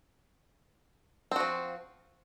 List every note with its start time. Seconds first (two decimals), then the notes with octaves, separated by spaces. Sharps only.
1.31 C4
1.36 F#4
1.40 F3